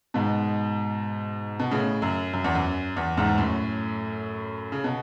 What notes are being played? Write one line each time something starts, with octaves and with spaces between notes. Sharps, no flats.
G#2 B2
B2
A2 C#3
F#2
F#2
E2
F#2
E2
E2 G#2
F#2 A2
C#3
B2